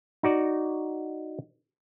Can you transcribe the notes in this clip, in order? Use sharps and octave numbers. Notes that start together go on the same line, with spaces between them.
D#4 F#4 D5